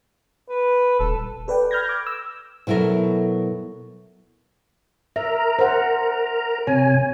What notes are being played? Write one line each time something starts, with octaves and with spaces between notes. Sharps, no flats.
B4
D#1 A4
A4 B4 D5 G5
B5 F6 G6 G#6 A#6
D6
E6
B2 F#3 E4 A4 A#4
A#4 E5 A#5
C5 F#5
C3 C#5 G#5